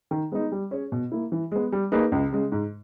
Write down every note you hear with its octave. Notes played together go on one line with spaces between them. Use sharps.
D#3
G#3 B3 D#4
G3
C#4 G#4 C#5
B2
A#3 E4
E3
G#3 B3
G3
A#3 D#4 G#4 B4
C#2
C#3 G#3
G#2